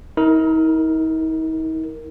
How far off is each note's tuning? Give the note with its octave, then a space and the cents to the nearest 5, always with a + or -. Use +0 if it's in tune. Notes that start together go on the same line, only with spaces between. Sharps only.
D#4 +45 A#4 +0